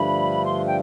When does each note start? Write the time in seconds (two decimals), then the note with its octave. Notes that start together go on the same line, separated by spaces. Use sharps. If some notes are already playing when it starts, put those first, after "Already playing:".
Already playing: G2 D3 F3 A3 B5
0.46 C6
0.66 G5